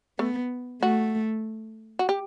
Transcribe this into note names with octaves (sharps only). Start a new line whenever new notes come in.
A3 B3
A3 F#4
F#4
G4